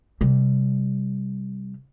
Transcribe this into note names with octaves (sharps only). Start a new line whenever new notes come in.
C3 G3